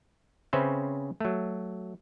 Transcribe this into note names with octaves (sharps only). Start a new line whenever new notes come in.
C#3 C4 C#4 B4 C5 E5
F#3 A3